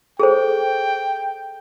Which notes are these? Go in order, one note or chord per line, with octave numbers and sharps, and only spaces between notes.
G#4 A4 C5 G5